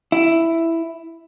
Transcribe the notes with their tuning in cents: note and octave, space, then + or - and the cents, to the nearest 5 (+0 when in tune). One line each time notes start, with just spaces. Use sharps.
E4 +5